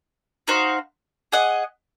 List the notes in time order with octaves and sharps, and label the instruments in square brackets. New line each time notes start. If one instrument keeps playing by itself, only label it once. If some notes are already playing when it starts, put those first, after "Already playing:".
[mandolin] D#4 F#4 C5 F5
G#4 D#5 F#5